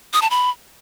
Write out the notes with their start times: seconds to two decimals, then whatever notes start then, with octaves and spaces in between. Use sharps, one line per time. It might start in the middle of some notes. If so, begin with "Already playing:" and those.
0.13 D#6
0.22 A5
0.31 B5